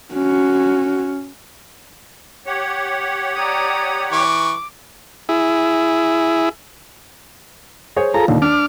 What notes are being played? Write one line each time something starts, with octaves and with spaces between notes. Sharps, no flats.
C#4 F#4
G4 C#5 F#5
D5 A#5 D#6
E3 C#6 D6
E4 G#4
G#4 C5 C#5
F4 G#4 A4 A#5
D#2 A#2 D3 D#3
D4 D6 F6